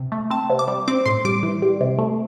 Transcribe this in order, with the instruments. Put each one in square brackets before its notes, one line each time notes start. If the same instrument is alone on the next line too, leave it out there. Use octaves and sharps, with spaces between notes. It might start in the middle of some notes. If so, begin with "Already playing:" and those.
Already playing: [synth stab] C3
A3
C4 A5
C3
D6
G3
C4 D6
A2 C6
G3 D6
E3
G3
C3
A3